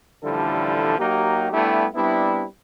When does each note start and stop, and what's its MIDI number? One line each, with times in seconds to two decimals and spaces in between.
0.24 0.98 33
0.24 0.98 50
0.24 0.98 53
0.24 0.98 55
0.24 0.98 64
0.24 0.98 69
0.98 1.48 54
0.98 1.48 58
0.98 1.48 63
0.98 1.48 67
1.52 1.86 55
1.52 1.86 57
1.52 1.86 59
1.52 1.86 62
1.52 1.86 64
1.52 1.86 67
1.95 2.45 55
1.95 2.45 59
1.95 2.45 60
1.95 2.45 62
1.95 2.45 64